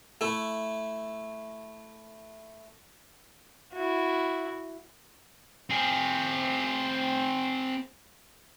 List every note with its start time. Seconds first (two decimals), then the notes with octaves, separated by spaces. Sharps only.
0.21 A3 E4
3.74 E4 F#4
5.70 C4 G#4